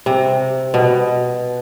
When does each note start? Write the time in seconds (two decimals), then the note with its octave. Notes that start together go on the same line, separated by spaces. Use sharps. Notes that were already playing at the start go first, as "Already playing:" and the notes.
0.06 C3
0.74 B2